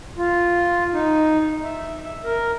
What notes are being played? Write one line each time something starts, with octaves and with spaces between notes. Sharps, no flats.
F4
D#4
E5
A#4